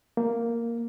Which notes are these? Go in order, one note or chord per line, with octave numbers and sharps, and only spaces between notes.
A#3